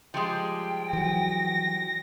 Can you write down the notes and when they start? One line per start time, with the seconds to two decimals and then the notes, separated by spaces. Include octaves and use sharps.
0.14 F3 G3 G#3 G5
0.93 E3 F#3 A#6